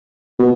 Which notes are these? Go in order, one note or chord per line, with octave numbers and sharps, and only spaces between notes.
B2